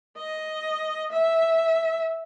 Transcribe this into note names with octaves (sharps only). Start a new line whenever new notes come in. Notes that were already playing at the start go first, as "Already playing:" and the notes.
D#5
E5